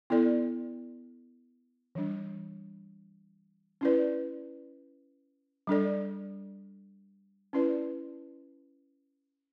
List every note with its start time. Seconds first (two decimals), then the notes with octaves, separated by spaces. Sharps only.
0.10 B3 E4 A4 D5
1.95 E3 G3 D4
3.81 C#4 E4 B4 D5
5.67 G3 D4 A4 D5
7.53 C#4 E4 B4 D5